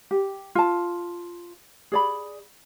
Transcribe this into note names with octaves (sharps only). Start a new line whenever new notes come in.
G4
F4 A5
G#4 D5 B5